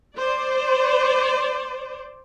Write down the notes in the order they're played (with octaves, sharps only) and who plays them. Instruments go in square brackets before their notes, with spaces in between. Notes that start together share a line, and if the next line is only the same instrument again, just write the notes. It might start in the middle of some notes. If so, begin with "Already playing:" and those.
[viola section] C5 D5